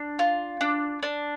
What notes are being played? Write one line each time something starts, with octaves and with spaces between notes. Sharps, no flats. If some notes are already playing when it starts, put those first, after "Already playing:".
Already playing: D4
F4
D4
D4